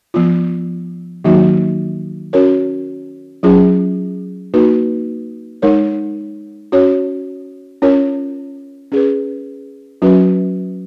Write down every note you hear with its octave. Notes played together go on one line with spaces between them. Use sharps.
F3 B3 F4
D#3 F#3 A#3 D#4 F#4
C#4 F#4 A#4 C#5
F#3 C#4 F4 G#4
A#3 D#4 F#4 B4
G#3 D#4 A#4 C#5
C#4 F#4 C#5
C#4 F4 A#4 C#5
C#4 G#4 B4
F#3 C#4 F#4 B4